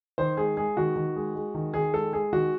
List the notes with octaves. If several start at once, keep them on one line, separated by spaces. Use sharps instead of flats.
D#3 C5
G#3 G#4
G#3 G#4
D#3 F#4
D#3
G#3
G#3
D#3
D#3 G#4
G#3 A4
G#3 G#4
D#3 F#4